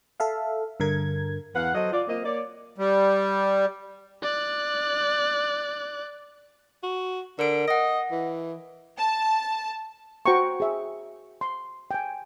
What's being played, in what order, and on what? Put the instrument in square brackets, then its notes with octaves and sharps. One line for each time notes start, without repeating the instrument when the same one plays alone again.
[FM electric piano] A4 E5 F5
G2 D3 A#4 G#6
[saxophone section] E2 B4 F5 F#5
F#3 A4 C5 D#5
F4 D5
A#3 C4 F4 D#5
A#3 C#5 D5
[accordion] G3
[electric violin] D5 F#6
[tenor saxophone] F#4
[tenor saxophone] D3 [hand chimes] A#4 D7
[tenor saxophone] D#5 [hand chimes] F#5 A#6
[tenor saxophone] E3
[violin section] A5
[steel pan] F#4 C5 F#5 G5 A#5 C#6
G#4 E5
C6
G5 G#5